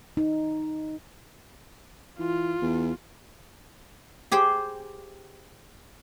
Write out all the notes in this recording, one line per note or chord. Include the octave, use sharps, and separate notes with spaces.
D#4
E3 F4
E2
G4 G#4 C5 G5